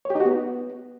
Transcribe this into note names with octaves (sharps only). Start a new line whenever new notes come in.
C#5
G4
D#4
F#4
B3